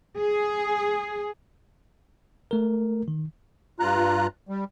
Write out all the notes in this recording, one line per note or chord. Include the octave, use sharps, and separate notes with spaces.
G#4
A3 A#4
D#3
G2 F4 A#5 F#6
G3